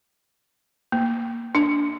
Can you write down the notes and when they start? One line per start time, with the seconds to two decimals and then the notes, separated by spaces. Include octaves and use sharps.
0.92 A#3
1.55 D4